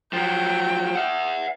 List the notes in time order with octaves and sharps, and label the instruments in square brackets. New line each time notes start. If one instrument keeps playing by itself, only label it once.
[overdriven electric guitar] F3 F#3 [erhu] G5
[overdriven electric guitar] E5 F#5